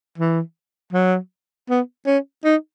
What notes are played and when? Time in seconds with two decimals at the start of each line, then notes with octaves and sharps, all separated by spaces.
0.18 E3
0.93 F#3
1.69 B3
2.06 C#4
2.44 D#4